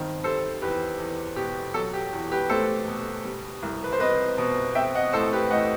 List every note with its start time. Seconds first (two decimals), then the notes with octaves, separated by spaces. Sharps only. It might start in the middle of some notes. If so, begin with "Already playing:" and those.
Already playing: G2 D#3 C4
0.23 G3 A4 C5
0.62 E2 G4 B4
0.99 E2
1.36 B2 G4
1.74 F#3 A4
1.93 G4
2.12 E2
2.32 G4 B4
2.49 A3 A4 C5
2.88 B2
3.25 G3
3.63 C2
3.84 B4
3.93 C5
4.00 C4 B4 D#5
4.38 B2
4.75 C4 E5 G5
4.95 D#5 F#5
5.13 A2 A4 C5
5.33 G4 B4
5.51 A2 D#5 F#5